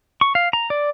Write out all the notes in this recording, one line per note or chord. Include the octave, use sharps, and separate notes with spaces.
C#6
F5
A#5
D5